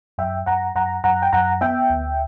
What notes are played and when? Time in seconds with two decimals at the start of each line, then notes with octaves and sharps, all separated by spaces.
0.18 F#2 E5 G5
0.46 F#2 F#5 A#5
0.75 F#2 F#5 A#5
1.04 F#2 F#5 A#5
1.22 G5
1.33 F#2 F#5 A#5
1.61 B3 E5 G5
1.90 D2